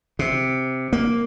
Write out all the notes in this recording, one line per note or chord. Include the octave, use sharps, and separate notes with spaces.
C3
A#3